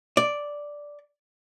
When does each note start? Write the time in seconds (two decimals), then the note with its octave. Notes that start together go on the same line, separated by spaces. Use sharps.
0.17 D5